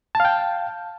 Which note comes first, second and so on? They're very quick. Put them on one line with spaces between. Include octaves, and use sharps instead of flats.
A5 F5 G5